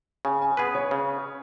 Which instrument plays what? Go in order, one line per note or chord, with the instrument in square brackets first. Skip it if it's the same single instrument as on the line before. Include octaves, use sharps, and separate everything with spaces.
[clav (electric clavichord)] C#3 [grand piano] G#5
[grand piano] G#5
[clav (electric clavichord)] B3 G#4 B4 [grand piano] B5
[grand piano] C#5
[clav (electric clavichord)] C#3